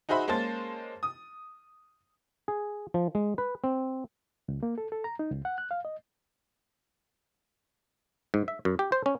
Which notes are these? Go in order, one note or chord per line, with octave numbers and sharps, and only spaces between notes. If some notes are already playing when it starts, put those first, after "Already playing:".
D#4 F#4 G#4 C5 E5 B5
G#3 A#3 C#4 C5 A5 A6
D#6
G#4
F3
G#3
B4
C4
C#2
A#3
A4
A4
A#5
D#4
C#2
F#5
F#6
F5
D#5
G#2
E5
F#2
G4
C5
C#4